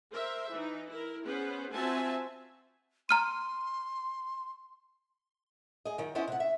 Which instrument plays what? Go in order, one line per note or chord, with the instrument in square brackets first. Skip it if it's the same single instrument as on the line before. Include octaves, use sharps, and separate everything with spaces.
[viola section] A#4 C5 E5
E3 D#4
E4 A#4
B3 C#4 G#4 B4 C5
C4 F4 F#4 E5 G#5 A5
[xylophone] A#5 F6 D#7 [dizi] C6
[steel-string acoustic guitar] G#4 D#5
F#2 D#3
B3 C#4 E4 C5 D#5
C3 F#5
E5